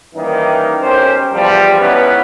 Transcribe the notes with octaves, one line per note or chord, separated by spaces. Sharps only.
D#3 E3 G3 A#3 C#4 D#4
B1 C#4 G4 A#4 C5
E2 F3 G3
C#2 B3 C#4 D#4 E4 B4